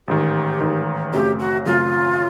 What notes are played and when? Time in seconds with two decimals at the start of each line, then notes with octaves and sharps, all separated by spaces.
0.08 A1 G#2 D#3 G4
0.60 A1 G#2 D#3
1.13 F#2 C#3 F#3 A3 C4 G4
1.39 F#4
1.66 F#2 C#3 F#3 A3 C4 F4